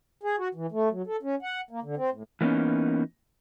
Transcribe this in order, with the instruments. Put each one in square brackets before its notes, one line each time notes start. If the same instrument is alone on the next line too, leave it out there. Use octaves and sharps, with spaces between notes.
[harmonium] G#4
F#4
E3
A3
F#3
A4
C#4
F#5
A#3
D3
C4
A2
[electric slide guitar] E3 A#3 B3 C#4 D#4